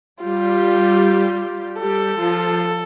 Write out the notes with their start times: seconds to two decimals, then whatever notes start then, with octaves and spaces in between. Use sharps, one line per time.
0.22 G3 F4 G4
1.80 G3 G4 A4
2.19 F3 F4